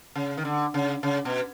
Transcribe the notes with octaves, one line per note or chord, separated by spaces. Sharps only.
C#3
D#3
D3
C#3
C#3
B2